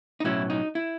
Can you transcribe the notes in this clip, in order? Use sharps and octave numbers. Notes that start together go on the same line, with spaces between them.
D#4
B1 A2 F#3 C#4 E4
D#4
E4